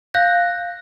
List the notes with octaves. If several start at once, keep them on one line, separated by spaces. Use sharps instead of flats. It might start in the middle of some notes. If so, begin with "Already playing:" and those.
F5 F#6 G6 A#6